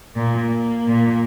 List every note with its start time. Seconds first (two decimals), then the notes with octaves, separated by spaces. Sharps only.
0.14 A#2 A#3
0.87 A#2